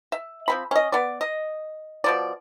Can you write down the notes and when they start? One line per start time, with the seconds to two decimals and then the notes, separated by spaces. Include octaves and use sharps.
0.12 E5
0.48 F3 C4 B5
0.71 C#4 D#5
0.92 B3 D5
1.21 D#5
2.04 B2 F3 D5